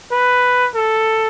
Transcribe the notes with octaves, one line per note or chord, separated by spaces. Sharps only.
B4
A4